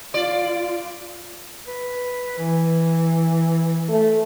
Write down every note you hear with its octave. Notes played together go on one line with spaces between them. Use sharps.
F4 D5
B4
E3
A3